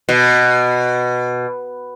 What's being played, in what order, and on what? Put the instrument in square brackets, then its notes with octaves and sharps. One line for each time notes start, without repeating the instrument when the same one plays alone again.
[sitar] B2